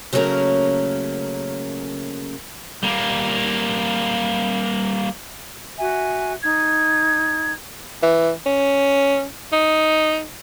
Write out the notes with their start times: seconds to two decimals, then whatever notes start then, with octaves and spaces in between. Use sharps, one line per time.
0.13 C#3 F#3 A3 A#3 C#4 A#4
2.83 G3 A#3
5.78 F#4 E5 G#5
6.42 D#4 G#6
8.02 E3
8.46 C#4
9.53 D#4